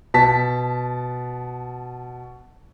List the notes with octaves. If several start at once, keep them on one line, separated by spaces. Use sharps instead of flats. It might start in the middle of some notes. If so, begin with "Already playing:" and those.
B2 A5 B6